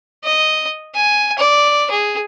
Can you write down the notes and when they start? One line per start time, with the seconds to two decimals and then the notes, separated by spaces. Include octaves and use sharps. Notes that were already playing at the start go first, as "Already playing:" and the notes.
0.24 D#5
0.95 G#5
1.38 D5
1.91 G#4